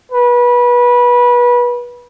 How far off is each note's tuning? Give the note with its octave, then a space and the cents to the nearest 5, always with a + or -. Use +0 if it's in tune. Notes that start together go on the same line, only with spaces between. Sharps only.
B4 -25